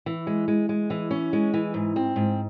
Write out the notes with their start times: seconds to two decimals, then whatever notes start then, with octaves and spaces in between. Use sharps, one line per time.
0.06 E3
0.27 G#3
0.48 G#3
0.69 G#3
0.90 E3
1.11 C#4
1.33 G#3
1.54 E3
1.74 G#2
1.96 C4
2.16 G#2